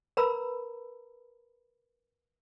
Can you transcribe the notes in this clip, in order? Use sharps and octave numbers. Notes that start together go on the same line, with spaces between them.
A#4 B4 A#5 B5 E6